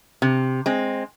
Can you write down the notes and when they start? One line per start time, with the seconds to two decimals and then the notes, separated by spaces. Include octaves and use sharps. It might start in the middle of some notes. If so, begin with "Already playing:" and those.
0.22 C3
0.66 G#3 C4